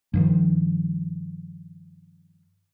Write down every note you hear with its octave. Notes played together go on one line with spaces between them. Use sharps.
G2 D#3 F3